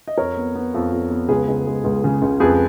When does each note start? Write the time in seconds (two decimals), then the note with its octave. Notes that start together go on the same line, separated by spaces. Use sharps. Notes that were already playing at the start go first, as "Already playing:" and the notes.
0.07 D#5
0.18 F2 A#4 C#5
0.37 B3
0.55 B3
0.74 F2
0.92 F2
1.11 B3
1.29 C#2 G#4 B4
1.48 C#2
1.66 G#3
1.84 C#2
2.04 C#3
2.22 C#2
2.40 F2 G#4 B4